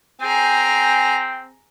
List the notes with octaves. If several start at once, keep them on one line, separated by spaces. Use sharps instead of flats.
C4 G#4 G5 G#5 A#5